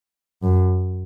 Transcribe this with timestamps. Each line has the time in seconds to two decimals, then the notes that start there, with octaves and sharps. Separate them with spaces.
0.43 F#2